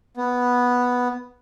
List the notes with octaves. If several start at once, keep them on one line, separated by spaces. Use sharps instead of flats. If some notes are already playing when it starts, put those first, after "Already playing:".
B3